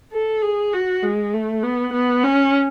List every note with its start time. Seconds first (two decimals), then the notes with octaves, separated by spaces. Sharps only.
0.13 A4
0.42 G#4
0.73 F#4
1.03 G#3
1.34 A3
1.63 B3
1.93 B3
2.23 C#4